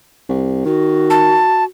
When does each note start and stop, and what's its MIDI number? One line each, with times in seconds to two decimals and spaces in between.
0.29 0.61 36
0.65 1.41 51
0.65 1.65 66
1.10 1.64 81